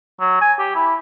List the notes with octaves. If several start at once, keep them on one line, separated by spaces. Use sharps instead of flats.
F#3
G#5
G4
E4